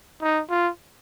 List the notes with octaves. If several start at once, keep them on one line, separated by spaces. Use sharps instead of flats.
D#4
F4